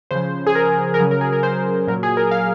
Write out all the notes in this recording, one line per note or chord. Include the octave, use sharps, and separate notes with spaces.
C#3 F3 C5
G#4
A#4
A#4
C#3 F#3 G#4
A#4
G#4
A#4
C5
A#2 F#3 A#4
G#4
A#4
F5